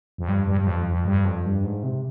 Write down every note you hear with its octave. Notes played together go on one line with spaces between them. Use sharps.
F2
G2
G2
G2
F2
F2
G2
F2
G2
G#2
C3